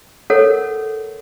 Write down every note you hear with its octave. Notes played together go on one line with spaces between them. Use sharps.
A4 A#4 C#5 F#5